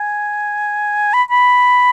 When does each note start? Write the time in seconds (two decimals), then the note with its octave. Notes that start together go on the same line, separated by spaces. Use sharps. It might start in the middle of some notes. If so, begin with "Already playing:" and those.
Already playing: G#5
1.14 B5
1.31 B5